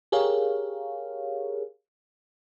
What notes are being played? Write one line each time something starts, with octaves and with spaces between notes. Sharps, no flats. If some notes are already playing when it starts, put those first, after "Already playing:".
G4 G#4 A#4 C#5 F5